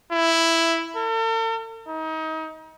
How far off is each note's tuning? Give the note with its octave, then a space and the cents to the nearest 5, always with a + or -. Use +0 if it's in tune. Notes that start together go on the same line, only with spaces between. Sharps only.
E4 +5
A4 +45
D#4 +30